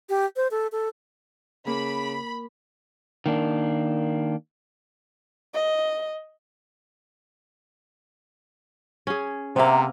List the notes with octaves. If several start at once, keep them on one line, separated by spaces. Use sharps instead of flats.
G4
C5
A4
A4
C#3 A#3 B5
D#3 A#3 D4
D#5
C#4 G#4
C3 A#3 B3 C5 E5 A#5